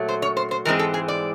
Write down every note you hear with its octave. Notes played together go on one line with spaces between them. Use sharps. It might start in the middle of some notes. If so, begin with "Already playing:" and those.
Already playing: A#2 F#3 A3
C5
C#5
C5
C5
G#2 E3 G#3 C4 A#4
A4
G#4
D5